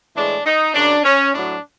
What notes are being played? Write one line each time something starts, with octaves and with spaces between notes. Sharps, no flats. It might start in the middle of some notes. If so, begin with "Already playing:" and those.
A2 E3 G#3 D4
D#4
F#2 C#3 F#3 D4
C#4
A2 F#3 D4